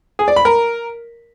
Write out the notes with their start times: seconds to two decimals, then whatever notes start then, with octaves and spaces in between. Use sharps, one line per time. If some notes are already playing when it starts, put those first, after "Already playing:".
0.19 G#4
0.28 D5
0.36 B5
0.45 A#4